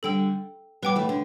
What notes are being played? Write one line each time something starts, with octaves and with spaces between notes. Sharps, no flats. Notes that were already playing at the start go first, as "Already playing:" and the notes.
D3 G3 A4 G5 E6
G3 B3 B4 G5 D6
E3 A3
D3